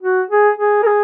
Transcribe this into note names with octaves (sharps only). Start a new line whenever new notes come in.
F#4
G#4
G#4
A#4
G#4